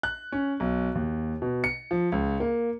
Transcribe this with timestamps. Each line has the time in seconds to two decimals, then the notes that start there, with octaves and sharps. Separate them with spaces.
0.03 F#6
0.32 C#4
0.60 B1
0.95 D#2
1.42 B2
1.64 C#7
1.91 F3
2.12 C#2
2.40 A#3